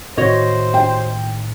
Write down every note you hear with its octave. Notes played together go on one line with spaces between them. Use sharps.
A2 D#3 F#4 C5 C#5 D#5
G5